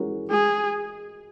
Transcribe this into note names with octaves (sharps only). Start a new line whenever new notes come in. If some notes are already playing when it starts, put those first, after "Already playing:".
Already playing: E3 G#3 C#4 F#4 A#4
G#3 G#4